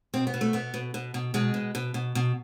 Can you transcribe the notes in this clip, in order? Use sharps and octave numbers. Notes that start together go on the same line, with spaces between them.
B2 C4
B3
B2
A3
B2 B3
B2
B2
B2
B2 G#3
B2
B2
B2
B2